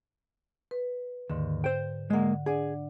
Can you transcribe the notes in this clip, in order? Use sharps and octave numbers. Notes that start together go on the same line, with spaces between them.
B4
D#2 G#2 D3
C5 G5
D3 G#3 A#3 F#5
D4 G#4 D5 F#5